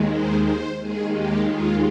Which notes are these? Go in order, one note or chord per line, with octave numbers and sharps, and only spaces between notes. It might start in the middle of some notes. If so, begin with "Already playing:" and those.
Already playing: D#2 D#3 G#3
C5
C5
D#2 D#3 G#3 G#4
G4
F4